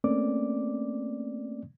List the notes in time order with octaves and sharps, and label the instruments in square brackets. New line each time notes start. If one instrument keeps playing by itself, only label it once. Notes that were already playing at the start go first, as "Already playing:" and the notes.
[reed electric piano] A3 A#3 C4 C#4 D5 D6